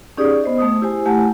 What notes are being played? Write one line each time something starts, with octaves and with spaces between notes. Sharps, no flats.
C#4 D#4 G4 G#4 D5 D#6
B3 C5 D#5
A3 D#6
E4 G4 C5 G#5
A3 E4 G4 F#5 G#5 A5